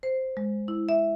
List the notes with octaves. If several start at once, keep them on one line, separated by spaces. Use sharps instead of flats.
C5
G#3
E4
E5